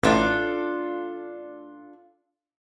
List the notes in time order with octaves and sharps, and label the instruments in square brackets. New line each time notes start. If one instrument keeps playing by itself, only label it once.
[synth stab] A1 [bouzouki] D4 F4 A4